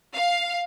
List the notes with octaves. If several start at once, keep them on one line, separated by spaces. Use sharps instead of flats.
F5